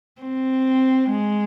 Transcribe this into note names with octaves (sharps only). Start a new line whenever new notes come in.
C4
G#3